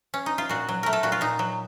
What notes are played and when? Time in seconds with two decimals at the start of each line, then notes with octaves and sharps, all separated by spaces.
0.14 C#4
0.26 D#4
0.38 F4
0.49 A#2 F#4
0.69 F#3
0.83 A3 A#4
0.93 A4
1.03 A#2 F#4
1.12 F4
1.21 A#2 D#4
1.39 F#3